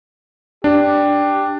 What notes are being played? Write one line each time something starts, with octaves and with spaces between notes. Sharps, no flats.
D4 G4